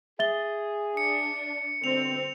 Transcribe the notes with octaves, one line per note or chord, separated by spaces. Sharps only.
G#4 E5 A6 G7
D4 C#7
G2 B2 D3 C4 F7